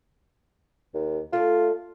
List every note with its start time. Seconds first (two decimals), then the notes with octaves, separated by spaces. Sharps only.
0.94 D#2
1.33 A3 D4 F4